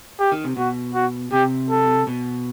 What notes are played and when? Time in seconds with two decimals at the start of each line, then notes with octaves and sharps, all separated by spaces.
0.20 G4
0.32 D#3
0.44 C3
0.57 B2 F#4
0.95 F#4
1.32 C3 G4
1.70 A4
2.07 B2